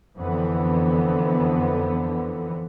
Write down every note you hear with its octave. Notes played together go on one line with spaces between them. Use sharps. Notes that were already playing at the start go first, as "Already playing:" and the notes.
F2 D3 E3 B3